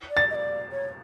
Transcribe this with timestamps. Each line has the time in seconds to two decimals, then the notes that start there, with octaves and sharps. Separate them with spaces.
0.10 D5
0.17 A6
0.31 D#5
0.35 D5
0.72 C#5